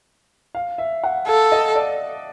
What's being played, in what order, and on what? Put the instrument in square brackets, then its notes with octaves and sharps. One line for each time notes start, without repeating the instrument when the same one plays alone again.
[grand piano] F5
E5
F#5
[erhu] A4 [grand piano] F5
[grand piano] D#5
D5